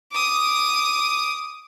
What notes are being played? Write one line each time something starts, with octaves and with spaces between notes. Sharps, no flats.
D6 D#6